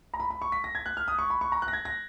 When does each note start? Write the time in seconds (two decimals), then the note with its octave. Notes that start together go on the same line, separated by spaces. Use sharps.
0.14 A#5
0.20 B5
0.30 B5
0.42 C#6
0.52 B6
0.64 A#6
0.75 G#6
0.86 F#6
0.97 F6
1.08 D#6
1.19 C#6
1.30 B5
1.41 C#6
1.52 A#5
1.62 F#6
1.68 A#6
1.73 G#6
1.85 A#6